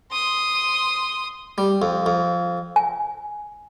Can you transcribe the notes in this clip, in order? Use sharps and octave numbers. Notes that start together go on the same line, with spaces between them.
C6 D#6
G3
F2
F2
G#5